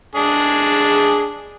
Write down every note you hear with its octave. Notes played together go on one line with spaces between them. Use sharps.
G#3 D4 G#4